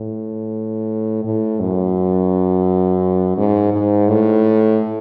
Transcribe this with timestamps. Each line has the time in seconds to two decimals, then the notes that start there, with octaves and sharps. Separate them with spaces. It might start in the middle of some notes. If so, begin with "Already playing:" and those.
Already playing: A2
1.25 A2
1.60 F#2
3.37 G#2
3.72 G#2
4.08 A2